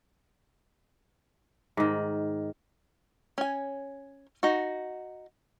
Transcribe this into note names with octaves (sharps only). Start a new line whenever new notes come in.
G#2 D#3
C#4 G#5
D#4 F#4